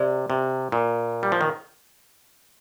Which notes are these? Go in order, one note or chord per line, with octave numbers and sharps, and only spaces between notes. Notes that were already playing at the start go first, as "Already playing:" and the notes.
Already playing: C3 D5 G5
C3
A#2
G3
F3
D#3